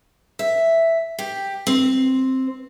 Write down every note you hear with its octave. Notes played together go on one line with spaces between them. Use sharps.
E5
G4
C4